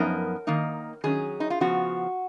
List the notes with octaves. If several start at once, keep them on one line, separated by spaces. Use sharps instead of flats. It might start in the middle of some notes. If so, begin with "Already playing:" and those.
Already playing: F#2 F3 B3 D#4 A#4
D#3 A#3 D#4
D#3 F#3 C#4 G#4
D#4
F4
C#3 F3 B3 F#4